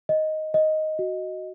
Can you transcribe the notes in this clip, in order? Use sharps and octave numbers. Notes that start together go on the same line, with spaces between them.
D#5
D#5
F#4